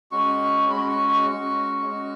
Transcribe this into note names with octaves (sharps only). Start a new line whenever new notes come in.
G#3 C#4 F#4 C#6
G#3 C#4 F#4 B5
C#6
C#6
G#3 C#4 F#4
G#3 C#4 F#4